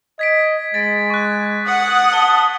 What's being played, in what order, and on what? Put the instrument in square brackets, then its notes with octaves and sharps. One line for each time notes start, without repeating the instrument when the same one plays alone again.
[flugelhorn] D#5 [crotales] G#6 B6 D7
[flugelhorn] G#3 [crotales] A6 D7
[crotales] C#6 F#6
[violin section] F#5 [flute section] D#6
[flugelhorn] A5 [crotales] G7